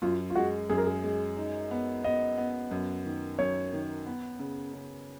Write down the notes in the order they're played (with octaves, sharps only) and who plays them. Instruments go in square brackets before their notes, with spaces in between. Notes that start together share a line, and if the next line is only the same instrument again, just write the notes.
[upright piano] F#2 [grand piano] F4
[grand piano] F4
[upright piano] G#3 [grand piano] F#4
[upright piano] F#2 [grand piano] G#4
[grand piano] A#4
G#4
[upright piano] G#3
D#4
B3
[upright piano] B3 [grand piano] D#5
[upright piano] B3
F#2
D#3
[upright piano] F#2 [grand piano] C#5
[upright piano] D#3
B3
C#3
C#3